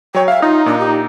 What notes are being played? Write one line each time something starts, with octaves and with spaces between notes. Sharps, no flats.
F#3 C#5 G5
E5 F5
D#4 F4
A#2 D4
G4